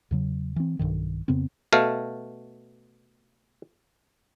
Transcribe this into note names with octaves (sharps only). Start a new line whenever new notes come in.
E2 C#3 F#3
E3 C4
B1 E2 G2 D#3
F2 C#3 B3 C4
B2 A3 F5